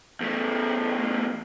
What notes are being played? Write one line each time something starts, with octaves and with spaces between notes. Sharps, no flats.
E2 A3